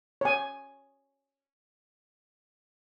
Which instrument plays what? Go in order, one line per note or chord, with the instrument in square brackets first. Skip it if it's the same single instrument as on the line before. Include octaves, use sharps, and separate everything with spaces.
[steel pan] C#5 G#5